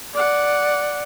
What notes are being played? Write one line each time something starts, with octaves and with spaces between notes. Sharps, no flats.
D5 F#5